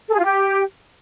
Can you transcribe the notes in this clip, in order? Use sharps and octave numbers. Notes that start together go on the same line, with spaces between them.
A4
G#4
F4
G4